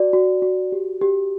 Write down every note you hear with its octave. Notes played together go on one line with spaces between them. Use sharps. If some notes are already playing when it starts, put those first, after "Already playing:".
Already playing: F#4 D5
F#4
F#4
G4
G4